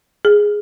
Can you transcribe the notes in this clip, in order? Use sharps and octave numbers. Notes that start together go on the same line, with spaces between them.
G#4